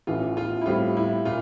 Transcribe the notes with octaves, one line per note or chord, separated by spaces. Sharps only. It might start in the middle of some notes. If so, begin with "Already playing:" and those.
A1 A2 E3 F4
F4
E4
A2 G3 C4 F4 G4
E4
A#2 F4